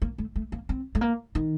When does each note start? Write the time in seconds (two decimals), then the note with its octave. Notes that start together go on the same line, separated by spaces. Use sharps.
0.02 A#3
0.18 A3
0.36 A3
0.52 A#3
0.69 C4
0.95 A3
1.01 A#3
1.35 D#3